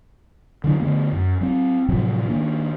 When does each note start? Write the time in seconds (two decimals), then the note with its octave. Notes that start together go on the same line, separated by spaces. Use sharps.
0.64 D3 F#3 D4
0.80 D3 E3 A3 B3
1.12 F#2
1.41 F#3 C4
1.89 A2 C3 F3 F#3
2.28 D#3 A#3 D4